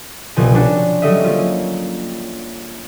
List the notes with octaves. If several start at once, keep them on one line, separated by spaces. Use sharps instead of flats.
C2 B2 F3 G#5
C#4 D4 F#4
F#3 G3 A3 C#4 D#5 E5
A#3 C#4 F4